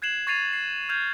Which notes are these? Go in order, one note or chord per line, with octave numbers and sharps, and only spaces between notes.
F#6 G#6 C7 E7 F#7
C#6 G#6 A6 C7 D#7 F7
C7
F6 G6 G#6 F7